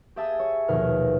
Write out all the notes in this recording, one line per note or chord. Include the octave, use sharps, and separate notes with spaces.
G4 G#4 E5 G#5 A5 E6
C#5
A#1 D#2 B2 A#4